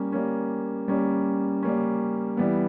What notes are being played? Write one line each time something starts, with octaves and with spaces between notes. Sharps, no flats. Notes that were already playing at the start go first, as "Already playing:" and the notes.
Already playing: G3 A#3 C#4
G3 A#3 C#4
G3 A#3 C#4
G3 A#3 C#4
E3 G3 B3